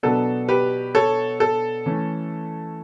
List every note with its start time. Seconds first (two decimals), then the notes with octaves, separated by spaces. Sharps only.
0.03 B2 F#3 B3 D4 A4
0.49 G4 B4
0.95 A4 C#5
1.40 A4
1.86 E3 A3 C#4